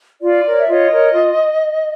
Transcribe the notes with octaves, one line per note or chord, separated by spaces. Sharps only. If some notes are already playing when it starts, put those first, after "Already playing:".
F4 D5
A#4 C#5
E5
F4 C#5 D#5
A#4 C#5
F4